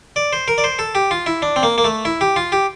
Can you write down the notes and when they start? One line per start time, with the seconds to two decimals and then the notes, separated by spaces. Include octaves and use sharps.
0.16 D5
0.33 C5
0.48 A#4
0.58 D5
0.64 C5
0.79 A4
0.95 G4
1.11 F4
1.26 E4
1.42 D4
1.56 C4
1.63 A#3
1.78 A#3
1.84 A3
2.05 E4
2.21 G4
2.36 F4
2.52 G4